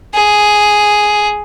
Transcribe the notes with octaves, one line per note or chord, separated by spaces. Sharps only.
G#4